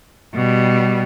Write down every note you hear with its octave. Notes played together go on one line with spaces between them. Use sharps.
B2 G3